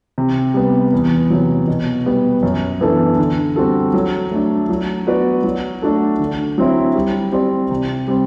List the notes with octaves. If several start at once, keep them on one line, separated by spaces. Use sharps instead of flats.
C3
G3 B3
E2
C3 F#3
B2
G3 B3
F#2
E3 B3 D4 A4
D3
G3 C4 F#4 A4
F#3
A3 D4
F#3
B3 F#4 B4 D5
F#3
A3 D4 F#4 A4
D3
F#3 C4 E4
G3
C4 G4 D5
C3
G3 C4